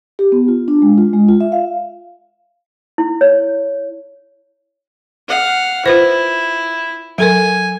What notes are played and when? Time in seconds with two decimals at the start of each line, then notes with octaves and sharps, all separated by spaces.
0.19 G4
0.32 B3
0.48 F4
0.68 D4
0.82 G#3
0.98 F4
1.13 G#3
1.28 F4
1.41 E5
1.52 F5
2.98 E4
3.21 C#5
5.29 F5 F#5
5.86 E4 F4 B4 C5
7.18 F#3 A4 A#4 G#5